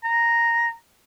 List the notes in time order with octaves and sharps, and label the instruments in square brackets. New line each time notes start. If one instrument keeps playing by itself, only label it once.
[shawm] A#5